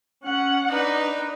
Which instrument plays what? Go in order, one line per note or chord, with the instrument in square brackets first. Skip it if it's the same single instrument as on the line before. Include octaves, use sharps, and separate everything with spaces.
[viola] C#4 F#5
[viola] D4 [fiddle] D#4 B4